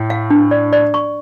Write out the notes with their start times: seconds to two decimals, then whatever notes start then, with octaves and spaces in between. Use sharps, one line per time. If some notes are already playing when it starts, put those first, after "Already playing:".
Already playing: A2
0.10 F5
0.30 D4
0.51 D5
0.73 D5
0.94 C#6